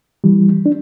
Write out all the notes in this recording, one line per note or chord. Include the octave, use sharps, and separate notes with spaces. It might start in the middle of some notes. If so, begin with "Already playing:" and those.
E3 G3
D4